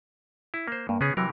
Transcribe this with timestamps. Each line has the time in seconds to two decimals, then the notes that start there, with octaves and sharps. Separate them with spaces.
0.54 E4
0.68 A#3 C5
0.89 G2 A#3
1.01 C#3 B3 C#4 G#4
1.17 C3 E3 F#3 A#4